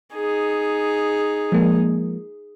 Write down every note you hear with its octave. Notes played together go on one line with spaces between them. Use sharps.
D#4 G#4
F3 G#3 A#3